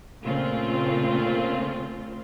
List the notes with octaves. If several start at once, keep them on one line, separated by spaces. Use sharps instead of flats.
A#2 C#3 A3 C4 F4